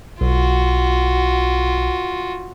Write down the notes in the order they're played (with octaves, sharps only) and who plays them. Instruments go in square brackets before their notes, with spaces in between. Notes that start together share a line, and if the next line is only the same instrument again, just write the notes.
[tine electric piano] B1 [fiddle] F4 F#4